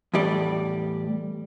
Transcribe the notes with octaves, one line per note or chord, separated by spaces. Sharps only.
E2 A2 G3 D5